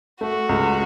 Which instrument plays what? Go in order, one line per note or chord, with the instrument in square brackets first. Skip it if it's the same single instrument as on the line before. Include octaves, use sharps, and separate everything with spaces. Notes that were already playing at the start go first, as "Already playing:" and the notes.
[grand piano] A3 [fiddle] F#4
[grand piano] C#2